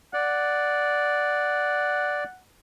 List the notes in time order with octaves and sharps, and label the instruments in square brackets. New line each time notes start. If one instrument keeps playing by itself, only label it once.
[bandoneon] D5 [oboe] F#5